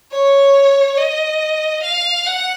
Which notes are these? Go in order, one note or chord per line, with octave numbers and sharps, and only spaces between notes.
C#5
D#5
F5
F#5